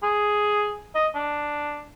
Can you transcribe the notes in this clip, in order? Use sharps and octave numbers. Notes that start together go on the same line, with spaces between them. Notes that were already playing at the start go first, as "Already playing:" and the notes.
G#4
D#5
D4